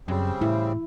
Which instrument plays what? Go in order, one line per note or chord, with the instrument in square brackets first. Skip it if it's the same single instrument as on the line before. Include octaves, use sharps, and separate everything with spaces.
[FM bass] F#2 [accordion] C#3 G3 C4
[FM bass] A2 [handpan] E4